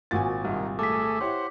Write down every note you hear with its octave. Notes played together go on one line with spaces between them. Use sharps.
G#1 A#2 F#4 G#5 A6
C2 A#2 D#3
A3 G#4 A4 D6 B6
E4 G4 C5 C#5 F#5